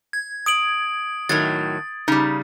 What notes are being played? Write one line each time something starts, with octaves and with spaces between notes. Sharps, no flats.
G#6
D#6 D7 F#7
A2 D#3 F#3 A6
C#3 G3 D#4